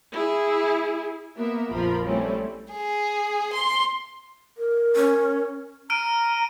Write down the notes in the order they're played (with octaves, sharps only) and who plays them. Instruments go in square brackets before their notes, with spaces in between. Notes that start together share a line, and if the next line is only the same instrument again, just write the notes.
[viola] E4 G#4
[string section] A#3 B3 A#4 E5
A#1 F2 F3 F4 A#4 B5
G3 A3 C4 C#4 E4
[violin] G#4
C6
[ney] A#4
[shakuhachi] C#4
[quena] A#5 [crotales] F6 D7 D#7